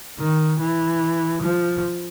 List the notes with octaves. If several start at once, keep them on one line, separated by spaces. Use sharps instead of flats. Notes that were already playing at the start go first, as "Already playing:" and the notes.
D#3
E3
F3